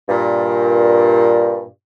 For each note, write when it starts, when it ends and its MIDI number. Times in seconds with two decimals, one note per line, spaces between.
0.09 1.63 43
0.09 1.63 46